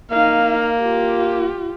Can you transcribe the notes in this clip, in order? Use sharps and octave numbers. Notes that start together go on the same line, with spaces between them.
A#3 D#4 F5
F4 G4